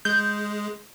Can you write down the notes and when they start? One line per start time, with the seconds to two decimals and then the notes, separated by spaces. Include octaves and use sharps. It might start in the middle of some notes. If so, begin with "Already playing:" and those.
0.05 G#3 G6